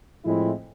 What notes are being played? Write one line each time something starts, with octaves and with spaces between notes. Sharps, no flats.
A2 F3 G#3 C4 E4